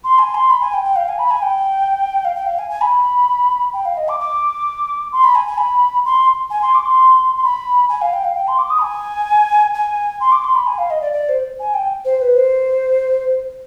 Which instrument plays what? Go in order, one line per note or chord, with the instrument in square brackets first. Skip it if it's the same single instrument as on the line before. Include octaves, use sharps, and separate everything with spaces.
[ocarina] C6
G#5
C6
B5
G#5
G5
G5
F5
G#5
B5
G#5
G5
F5
G5
F5
G#5
G#5
B5
G5
F5
D#5
D6
D6
C6
B5
G#5
G#5
B5
C6
G#5
C6
D6
C6
C6
B5
G#5
F5
G5
F5
G5
C6
D6
D#6
B5
G#5
G#5
C6
D6
C6
B5
G#5
F5
D#5
D5
D5
C5
G#5
G5
C5
B4
C5